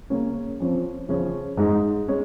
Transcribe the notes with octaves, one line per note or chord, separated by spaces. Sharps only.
C#3 A#3 C#4
F2 F3 C#4
C#3 F3 C#4
G#2 G#3 D#4
G#3 C#4